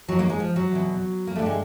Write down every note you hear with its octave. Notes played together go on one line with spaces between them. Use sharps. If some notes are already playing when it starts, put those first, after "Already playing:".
D#2 D#3 F#3
A#3
G#3
F3
F#3
E2 B2
A#3
G2 D3 A3
G#3